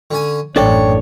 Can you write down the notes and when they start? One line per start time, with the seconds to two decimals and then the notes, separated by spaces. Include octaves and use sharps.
0.11 D3 C#4 G#5
0.56 A1 F#2 C4 D4 A4 C#5 D5